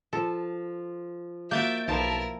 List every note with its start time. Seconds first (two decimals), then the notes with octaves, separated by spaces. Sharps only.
0.13 F3 A4
1.51 A#3 F#4 E5 G6 A6 D7
1.88 B1 F3 E4 A#4 A5